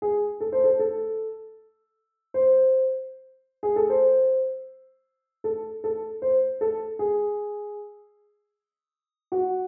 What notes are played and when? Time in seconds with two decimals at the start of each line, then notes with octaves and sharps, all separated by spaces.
0.02 G#4
0.40 A4
0.52 C5
0.64 A4
0.79 A4
2.34 C5
3.63 G#4
3.76 A4
3.90 C5
5.44 A4
5.84 A4
6.22 C5
6.61 A4
6.99 G#4
9.32 F#4